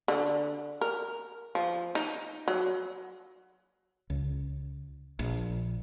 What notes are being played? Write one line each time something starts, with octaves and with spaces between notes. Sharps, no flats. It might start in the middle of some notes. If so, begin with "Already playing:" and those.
D3
A#4
F3
D#4
F#3
C#2
A#1